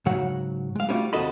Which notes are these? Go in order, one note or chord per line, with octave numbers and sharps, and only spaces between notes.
G#2 C#3 F#3 F#5
G#3 F5
G3 A3 C#4 D4 F4 F#4
D#2 C3 F#4 A4 D#5 B5